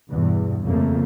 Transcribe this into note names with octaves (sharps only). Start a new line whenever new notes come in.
E2 G2 B2
F2 C#3 A3 A#3